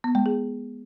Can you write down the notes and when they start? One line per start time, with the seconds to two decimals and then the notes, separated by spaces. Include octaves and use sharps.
0.04 B3
0.15 G#3
0.26 G#4